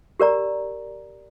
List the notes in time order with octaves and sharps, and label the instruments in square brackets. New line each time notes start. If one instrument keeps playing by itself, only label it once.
[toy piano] G4 A#4 D5 A#5